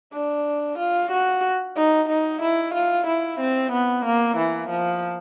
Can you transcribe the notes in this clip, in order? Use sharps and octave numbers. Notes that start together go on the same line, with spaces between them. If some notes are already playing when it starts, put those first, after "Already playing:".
D4
F4
F#4
D#4
D#4
E4
F4
E4
C4
B3
A#3
E3
F3